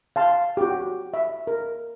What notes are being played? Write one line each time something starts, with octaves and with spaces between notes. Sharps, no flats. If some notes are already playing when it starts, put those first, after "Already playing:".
F5 A5 C6
F#4 G4
E5
A#4